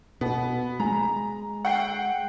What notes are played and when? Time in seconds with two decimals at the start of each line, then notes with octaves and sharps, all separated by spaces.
0.21 B2 B3
0.80 G#3 A#5
1.65 F#5 G5 C7